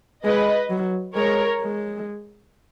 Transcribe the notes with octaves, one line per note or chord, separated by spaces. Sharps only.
G#3 B4 D#5
F#3
G#3 A#4 C#5
G#3